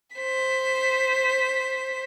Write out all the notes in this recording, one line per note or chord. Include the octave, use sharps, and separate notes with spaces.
C5 B6